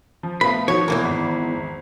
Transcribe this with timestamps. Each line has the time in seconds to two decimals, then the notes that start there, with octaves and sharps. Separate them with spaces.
0.23 F3
0.41 A3 B3 F5 B5
0.68 F3 D#4 F#4 C#5
0.88 E2 G#2 E3 A#3 A#4
1.05 G#1